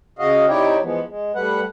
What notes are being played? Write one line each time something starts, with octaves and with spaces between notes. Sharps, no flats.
C#3 F#4 D#5 F5
C3 D#4 E4 C#5 D5 G5
E3 F3 G#3 B3
G#3
G3 A3 B4 F#5